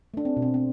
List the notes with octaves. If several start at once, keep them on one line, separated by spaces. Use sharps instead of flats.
A3 D4
C4
B2
C4
C4